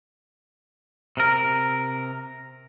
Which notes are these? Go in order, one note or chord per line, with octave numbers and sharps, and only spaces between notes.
C3 A#4